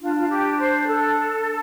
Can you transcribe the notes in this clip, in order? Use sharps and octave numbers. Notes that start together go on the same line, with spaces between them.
D4 F4
F4
G4
C5
A4